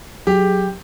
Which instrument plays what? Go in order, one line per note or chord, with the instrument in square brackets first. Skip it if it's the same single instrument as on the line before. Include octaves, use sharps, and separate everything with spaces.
[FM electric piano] F#3 G#4 [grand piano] G4